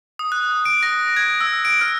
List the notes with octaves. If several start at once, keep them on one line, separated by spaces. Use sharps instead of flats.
D#6
F#6
D7
A#6
G#6
E6
D7
F6